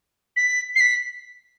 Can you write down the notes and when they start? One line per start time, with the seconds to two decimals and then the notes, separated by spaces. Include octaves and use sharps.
0.36 B6
0.75 C7
0.80 B6